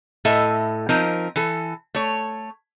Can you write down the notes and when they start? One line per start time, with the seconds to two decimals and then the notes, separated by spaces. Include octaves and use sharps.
0.25 A2 A4 D#5 E5
0.89 F3 C4 D#4 A#4
1.36 E3 A4
1.95 A3 C#5